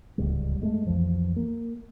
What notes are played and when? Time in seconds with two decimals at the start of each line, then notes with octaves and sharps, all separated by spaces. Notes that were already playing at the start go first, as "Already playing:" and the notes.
0.18 D1 C#2 G#2 G3
0.61 G2 G#3 A3
0.87 B1 F2 E3 F3
1.36 A#3